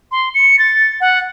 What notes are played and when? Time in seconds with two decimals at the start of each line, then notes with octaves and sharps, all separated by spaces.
0.12 C6
0.35 C#7
0.59 A6
1.01 F#5